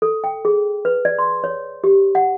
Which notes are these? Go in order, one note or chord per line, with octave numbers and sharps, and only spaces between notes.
A4
G5
G#4
B4
D5
C6
C#5
G4
F#5